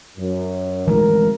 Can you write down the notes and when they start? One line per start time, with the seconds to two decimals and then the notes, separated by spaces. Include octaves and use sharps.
0.17 F#2
0.87 G#1 E3 G#3 A3 A#4